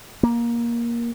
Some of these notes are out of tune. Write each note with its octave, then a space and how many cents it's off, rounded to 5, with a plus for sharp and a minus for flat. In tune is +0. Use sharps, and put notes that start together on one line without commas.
A#3 +15